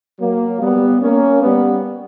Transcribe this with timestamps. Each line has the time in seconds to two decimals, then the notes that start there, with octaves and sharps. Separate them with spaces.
0.19 F#3 A#3
0.60 G3 B3
1.01 A#3 C#4
1.42 G3 B3